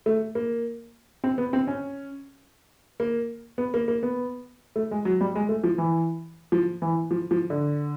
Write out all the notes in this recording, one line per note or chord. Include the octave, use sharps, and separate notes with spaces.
A3
A#3
C4
B3
C4
C#4
A#3
B3
A#3
A#3
B3
A3
G#3
F#3
G3
G#3
A3
F3
E3
F3
E3
F3
F3
D3